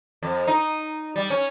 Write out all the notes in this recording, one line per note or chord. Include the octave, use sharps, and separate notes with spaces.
F2
D#4
G3
C#4